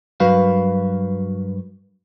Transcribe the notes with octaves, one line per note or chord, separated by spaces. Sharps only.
G2 F#3 F#4 A#4 B4 F5